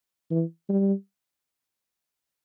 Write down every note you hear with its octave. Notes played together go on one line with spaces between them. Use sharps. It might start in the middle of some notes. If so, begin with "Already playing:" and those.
E3
G3